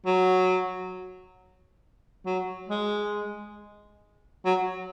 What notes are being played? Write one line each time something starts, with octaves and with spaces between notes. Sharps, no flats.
F#3
F#3
G#3
F#3